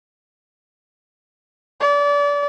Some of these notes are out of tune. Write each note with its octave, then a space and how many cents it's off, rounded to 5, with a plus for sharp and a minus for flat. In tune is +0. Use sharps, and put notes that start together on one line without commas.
D5 -30